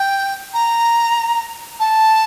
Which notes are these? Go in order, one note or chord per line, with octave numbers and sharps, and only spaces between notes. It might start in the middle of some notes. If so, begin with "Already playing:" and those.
Already playing: G5
A#5
A5